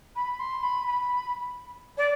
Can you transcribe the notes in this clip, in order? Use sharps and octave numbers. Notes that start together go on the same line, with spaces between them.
B5
C6
B5
B5
D5